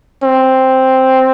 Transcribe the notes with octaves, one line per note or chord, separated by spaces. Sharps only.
C4